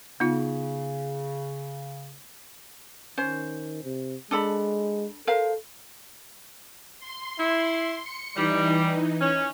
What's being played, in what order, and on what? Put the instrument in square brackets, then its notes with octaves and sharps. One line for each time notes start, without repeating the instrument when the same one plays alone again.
[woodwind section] C#3 [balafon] B3 D#4 F4
[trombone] D#3 [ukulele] C#4 C5
[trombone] C3
[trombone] G#3 [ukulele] D4 A4 B5
[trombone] A4 [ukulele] A#4 C5 F5
[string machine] C6
[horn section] E4
[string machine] C#7
[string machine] E3 D#4 [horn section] G3
[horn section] C#4